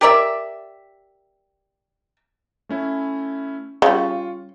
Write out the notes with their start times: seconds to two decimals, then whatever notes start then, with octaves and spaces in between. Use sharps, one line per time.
0.01 G4 A#4 D5 E5
2.69 A3 C#4 E4
3.82 C#3 G3 F4 C#6